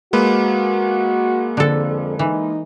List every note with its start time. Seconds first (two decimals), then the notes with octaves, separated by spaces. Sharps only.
0.13 G#3 A#3 F#4 B4
1.57 F2 D3 A4
2.19 E3 D#4